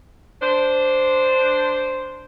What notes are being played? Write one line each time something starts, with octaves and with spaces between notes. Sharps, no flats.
D4 C5